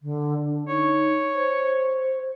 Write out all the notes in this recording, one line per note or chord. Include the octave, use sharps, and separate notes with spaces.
D3
D4
D#4 C#5
C5